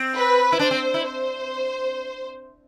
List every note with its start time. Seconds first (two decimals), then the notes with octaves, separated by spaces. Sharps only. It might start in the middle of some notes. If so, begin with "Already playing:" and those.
Already playing: C4
0.16 B4
0.52 E4
0.59 D4 C5
0.71 C4
0.94 E4
1.05 C5